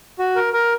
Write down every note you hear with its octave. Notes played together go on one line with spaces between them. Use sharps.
F#4
A#4
A#4